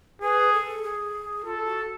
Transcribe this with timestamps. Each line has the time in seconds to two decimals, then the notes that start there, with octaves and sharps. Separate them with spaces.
0.22 G#4 B4
0.53 A4
0.83 G#4
1.45 F4 A4
1.65 F#4